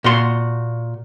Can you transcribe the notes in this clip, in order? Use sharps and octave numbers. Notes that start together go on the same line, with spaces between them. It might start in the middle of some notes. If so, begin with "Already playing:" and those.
A#2 F#4 C6